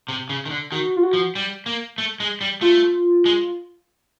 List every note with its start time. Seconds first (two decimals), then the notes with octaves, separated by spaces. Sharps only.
0.08 C3
0.29 C#3
0.46 D#3
0.51 D3
0.72 D#3 F#4
0.96 F4
1.03 F#4
1.13 F3
1.35 G3
1.66 A#3
1.98 A3
2.20 G#3
2.41 G3
2.61 A3 F4
3.26 G#3